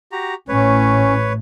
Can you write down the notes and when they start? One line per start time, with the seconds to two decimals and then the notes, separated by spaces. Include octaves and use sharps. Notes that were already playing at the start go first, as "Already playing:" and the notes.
0.12 F#4 G4 A#5
0.49 A1 A2 C#4 B4 C#5